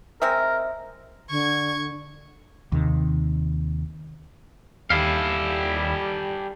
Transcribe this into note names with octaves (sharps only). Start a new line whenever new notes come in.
G#3 C4 A#4 E5
D3 C#6 G#6
D#2 C3 D#3
D#2 G3 E4 G4 A4 F5